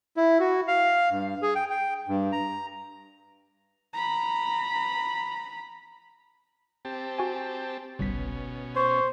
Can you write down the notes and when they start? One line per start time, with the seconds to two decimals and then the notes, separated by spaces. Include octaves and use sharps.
0.17 E4
0.40 F#4
0.68 F5
1.11 G2
1.42 G#4
1.55 G5
1.70 G5
2.08 G2
2.32 A#5
3.93 A#5 B5
6.85 C4 G4 A5
7.19 F#4 G#5
7.99 G1 C2 B2 C#4 B6
8.76 C5 C#6